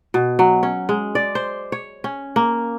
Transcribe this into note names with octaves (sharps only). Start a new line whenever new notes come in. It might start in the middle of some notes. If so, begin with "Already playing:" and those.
B2
F#3
C#4
G#3
D5
C5
C#5
C#4
A#3